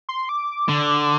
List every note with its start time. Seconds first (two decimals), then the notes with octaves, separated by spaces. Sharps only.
0.09 C6
0.29 D6
0.69 D3